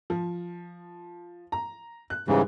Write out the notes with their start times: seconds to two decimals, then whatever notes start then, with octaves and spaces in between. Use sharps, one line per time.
0.10 F3
1.52 A#5
2.10 F#6
2.28 G#2 C#3 E3 G3